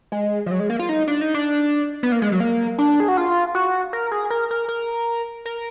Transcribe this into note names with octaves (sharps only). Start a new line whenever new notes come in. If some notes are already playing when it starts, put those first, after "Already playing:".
G#3
F3
F#3
G#3
A#3
F4
D#4
D4
D#4
D4
B3
A#3
G#3
F#3
A#3
D4
G#4
F#4
F4
F#4
A#4
G#4
A#4
A#4
A#4
A#4